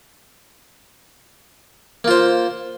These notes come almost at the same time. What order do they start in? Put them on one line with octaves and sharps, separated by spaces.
A#3 F4 C5